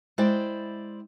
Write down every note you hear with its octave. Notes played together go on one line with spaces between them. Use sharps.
G#3 E4 C5 D5 G5